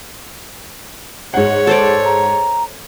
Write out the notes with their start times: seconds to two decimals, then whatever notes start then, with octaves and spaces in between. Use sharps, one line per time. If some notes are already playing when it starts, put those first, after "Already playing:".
1.34 G#2 C#5 F#5
1.67 A4 C5 D5
2.05 A#5